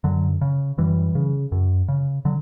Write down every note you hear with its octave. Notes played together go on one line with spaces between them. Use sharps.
F#2 D3 F#3
C#3
F#2 E3 G3
C#3
F#2
C#3
D3 F#3